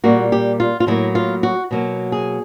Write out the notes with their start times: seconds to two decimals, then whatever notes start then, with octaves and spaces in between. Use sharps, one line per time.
0.04 A#2 G3 A#3 F#4
0.32 G4
0.60 F4
0.80 F4
0.87 A2 F#3 A#3 E4
1.15 F4
1.43 F#4
1.71 B2 F#3 A#3
2.12 G#4